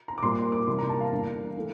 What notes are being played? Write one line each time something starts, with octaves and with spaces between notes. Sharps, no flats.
A#5
D6
A#2 G3 A#3 C6
C6
D6
C3 E3 G3 A#3 C6
A#5
A5
F5
E2 D3 G3 A#3
E3 A3